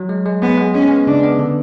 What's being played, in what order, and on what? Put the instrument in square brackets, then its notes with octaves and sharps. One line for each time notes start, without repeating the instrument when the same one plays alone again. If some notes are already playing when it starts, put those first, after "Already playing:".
Already playing: [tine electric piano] F#3
G#3
G#3
[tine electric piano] G#3 [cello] B3
[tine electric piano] G#3
[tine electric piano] G#3 [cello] C#4
[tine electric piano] B3
[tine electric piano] C#3 [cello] D4
[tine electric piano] B3
D3